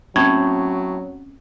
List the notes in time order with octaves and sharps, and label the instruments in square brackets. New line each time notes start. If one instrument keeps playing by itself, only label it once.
[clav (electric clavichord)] A2 [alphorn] F#3 [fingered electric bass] A#3 C4 C#4 [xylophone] G#6